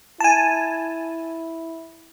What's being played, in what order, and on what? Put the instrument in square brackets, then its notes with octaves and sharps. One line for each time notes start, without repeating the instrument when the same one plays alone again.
[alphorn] E4 [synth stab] G#5 A5